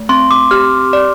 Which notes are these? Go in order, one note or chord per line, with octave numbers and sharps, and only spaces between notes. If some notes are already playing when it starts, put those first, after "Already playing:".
Already playing: A3
C4 C6
D6
G4 F6
D5